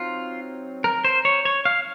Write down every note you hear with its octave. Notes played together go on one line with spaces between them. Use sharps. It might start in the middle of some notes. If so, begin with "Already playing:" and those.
Already playing: F#3 C4 D#4 F4
A#4
C5
C#5
C#5
F5